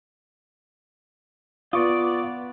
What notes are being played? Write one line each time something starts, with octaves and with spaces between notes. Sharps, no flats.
B3 F4 D5 C#6 D#6